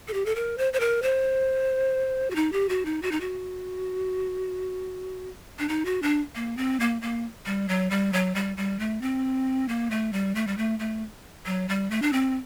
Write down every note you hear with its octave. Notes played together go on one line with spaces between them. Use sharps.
A4
G4
A4
A#4
C5
C5
A#4
C5
F#4
D#4
G4
F#4
D#4
F#4
D#4
F#4
D4
D#4
F#4
D4
A#3
C4
A#3
A#3
G3
F#3
G3
F#3
G3
G3
A3
C4
A#3
A3
G3
A3
G3
A3
A3
F#3
G3
A3
D4
C4